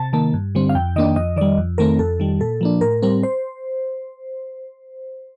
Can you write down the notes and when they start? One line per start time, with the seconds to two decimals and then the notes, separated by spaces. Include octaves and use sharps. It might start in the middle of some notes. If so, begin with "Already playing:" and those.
Already playing: C3 A5
0.13 D#3 A#3 A5
0.34 G2
0.55 D3 G3 C4
0.69 F5
0.75 F2 G5
0.96 D#3 A#3 D4 D#5
1.16 F2 D#5
1.36 D#3 G3 D5
1.58 F2
1.78 D#3 A3 C4 A#4
1.99 F2 A4
2.20 D#3 G3
2.40 A#2 A4
2.61 F3 A#3 D4
2.81 A2 A#4
3.02 G3 C4 A#4
3.23 C5